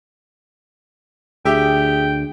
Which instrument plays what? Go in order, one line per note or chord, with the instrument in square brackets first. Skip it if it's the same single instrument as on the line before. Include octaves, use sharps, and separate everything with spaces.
[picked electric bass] D2 [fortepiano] G4 E5 [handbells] G#4 [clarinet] G5